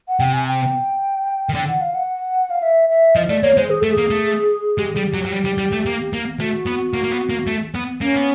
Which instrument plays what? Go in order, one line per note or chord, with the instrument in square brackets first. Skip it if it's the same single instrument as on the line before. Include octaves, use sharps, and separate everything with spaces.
[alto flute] F#5
[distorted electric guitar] C3 [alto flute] G5
[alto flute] G#5
G5
[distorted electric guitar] D#3
[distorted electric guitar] D3 [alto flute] G5
[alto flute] F#5
F5
F#5
F5
E5
E5
[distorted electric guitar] F3 [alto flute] D#5
[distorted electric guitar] A3 [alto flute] D5
[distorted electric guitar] A#3 [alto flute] C#5
[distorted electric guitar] G#3 [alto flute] C5
[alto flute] G#4
[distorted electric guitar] A3 [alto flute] A4
[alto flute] G#4
[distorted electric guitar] A#3
A3
[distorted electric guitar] G#3 [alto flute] G4
[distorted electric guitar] G3 [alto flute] G#4
[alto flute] G4
[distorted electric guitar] F#3
F#3
G3
G3
G3
A3
A#3
A#3
[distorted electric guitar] A3 [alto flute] F#4
[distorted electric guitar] B3
A#3
A#3
B3
A#3
A3
B3
[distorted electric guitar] A#3 [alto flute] C#4
[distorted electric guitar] B3